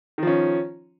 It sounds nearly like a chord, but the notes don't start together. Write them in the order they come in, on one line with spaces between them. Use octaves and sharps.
D#3 F3 C#4